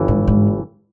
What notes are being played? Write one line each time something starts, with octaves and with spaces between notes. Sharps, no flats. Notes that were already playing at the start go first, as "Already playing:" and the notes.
Already playing: G1 G2 E3
G#2
G#2